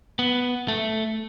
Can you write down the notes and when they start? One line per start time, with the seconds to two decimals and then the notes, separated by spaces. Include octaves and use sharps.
0.19 B3
0.68 A3